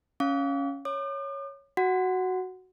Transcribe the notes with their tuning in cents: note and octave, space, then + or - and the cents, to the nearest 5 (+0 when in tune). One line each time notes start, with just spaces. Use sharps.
C#4 +0 F5 +0 D6 -45
C#5 +0 D6 +45
F#4 +0 F#5 +0